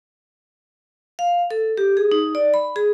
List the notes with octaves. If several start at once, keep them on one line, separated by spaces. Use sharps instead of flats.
F5
A4
G4
G#4
D#4
D5
B5
G#4